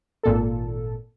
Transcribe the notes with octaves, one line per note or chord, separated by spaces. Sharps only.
G#1 A#2 A4